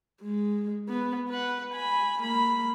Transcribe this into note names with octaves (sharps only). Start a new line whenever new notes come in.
G#3
B3
B4 F#5
G#5 B5
A#3 B5